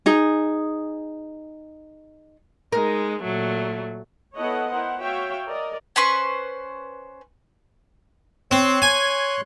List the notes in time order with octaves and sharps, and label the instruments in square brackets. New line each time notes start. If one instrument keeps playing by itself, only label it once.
[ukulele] D#4 G#4
[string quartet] G#3 D#4 [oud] A#4
[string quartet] A#2 F#3 A3
[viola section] B3 E4 A4 C#5 D#5 F#5
E4 A#4 C5 F#5
F#4 C#5 E5 F5 G5
A#4 D5 D#5
[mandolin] C#4 B4 C5 C#6
[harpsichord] C4 [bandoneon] C#5 C6 F#6
[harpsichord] G#5